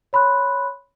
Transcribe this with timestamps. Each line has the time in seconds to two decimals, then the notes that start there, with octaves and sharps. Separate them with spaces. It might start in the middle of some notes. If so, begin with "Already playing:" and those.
0.13 C#5 B5 C6 F#6